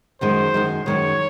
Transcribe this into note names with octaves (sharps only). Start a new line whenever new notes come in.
F#2 D#3 G#3 C5
F#2 D#3 G#3
F#2 D#3 G#3 C#5